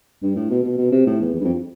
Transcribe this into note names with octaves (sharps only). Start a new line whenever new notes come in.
G2
A2
B2
B2
B2
C3
A2
E2
E2
G2
F2